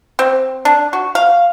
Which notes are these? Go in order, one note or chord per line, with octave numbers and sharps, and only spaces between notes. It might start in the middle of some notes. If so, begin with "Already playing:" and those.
C4
D4
F#4
F5